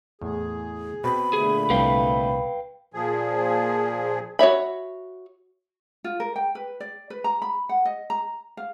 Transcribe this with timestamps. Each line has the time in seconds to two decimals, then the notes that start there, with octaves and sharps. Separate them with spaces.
0.21 E2 A2 G#4
1.04 B2 C4 B5
1.33 A#2 D3 A3 G#4
1.70 C2 B4 F5 G5
2.94 A#2 F3 G#4
4.39 F#4 C#5 E5 B5
6.04 F4
6.20 A#4
6.36 G5
6.55 B4
6.80 D5
7.10 B4
7.24 A#5
7.42 B5
7.69 F#5
7.85 D#5
8.10 A#5
8.57 F5